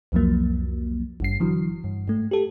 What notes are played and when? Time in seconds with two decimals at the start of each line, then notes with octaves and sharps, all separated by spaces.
0.12 C2 F2 F3 F#3 A#3
1.20 G#1 G2 C7
1.40 D3 E3 F#3
1.84 G2
2.08 G#2 A3
2.31 G4 A4